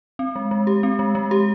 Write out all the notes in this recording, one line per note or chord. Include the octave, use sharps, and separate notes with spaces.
C4
G#3
G#3
G4
C4
G#3
G#3
G4